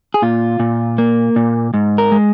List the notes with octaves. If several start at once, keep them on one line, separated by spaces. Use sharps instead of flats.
G#4
A#2 F4
A#2
A#3
A#2
G#2
A#4
G#3